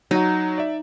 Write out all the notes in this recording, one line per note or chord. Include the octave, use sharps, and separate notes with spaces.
F#3 D#4 F#4
D5 E5